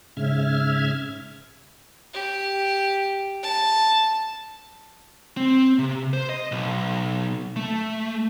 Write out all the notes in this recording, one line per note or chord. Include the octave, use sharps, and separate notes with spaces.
G#2 C#3 E5 F6 G#6
G4
A5
C4
C3
C5
D#5
B1
A3